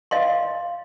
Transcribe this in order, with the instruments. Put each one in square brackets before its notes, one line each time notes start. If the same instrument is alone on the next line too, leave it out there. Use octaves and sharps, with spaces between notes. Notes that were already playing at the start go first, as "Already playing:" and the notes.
[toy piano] D#5 F5 C6